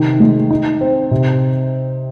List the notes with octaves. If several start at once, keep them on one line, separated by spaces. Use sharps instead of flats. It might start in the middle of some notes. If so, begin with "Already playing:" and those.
Already playing: C3 D#3
G#3
D#4
C4
C3